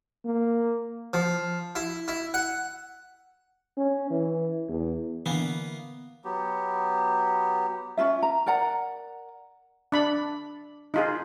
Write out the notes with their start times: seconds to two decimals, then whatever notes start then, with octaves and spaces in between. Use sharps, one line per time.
0.25 A#3
1.13 F3
1.75 E4
2.08 E4
2.34 F#5
3.77 C#4
4.10 E3
4.69 E2
5.26 D3 E3 A#3 B3
6.25 F#3 B3 G4
7.97 C#4 D#4 F4 E5
8.23 A#5
8.46 A#4 D5 F#5 A#5
9.92 D4 B5
10.94 D#4 F4 G#4